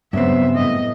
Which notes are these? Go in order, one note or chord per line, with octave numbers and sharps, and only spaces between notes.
G2 C#3 F#3 B3 C4 E5
A2 D#5